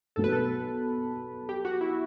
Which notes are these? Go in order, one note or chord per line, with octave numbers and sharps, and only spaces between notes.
B1 B2 F#3 B3 A4
B4
A4
G4
F#4
E4